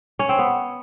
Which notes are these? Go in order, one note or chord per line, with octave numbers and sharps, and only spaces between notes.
C#4
C4
B3